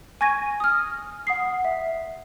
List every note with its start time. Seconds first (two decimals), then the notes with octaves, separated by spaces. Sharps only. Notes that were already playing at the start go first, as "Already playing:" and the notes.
0.21 G#5 C#6 G#6 A#6 D#7
0.60 D#6 F6
1.27 F#5 D#6 C7
1.65 E5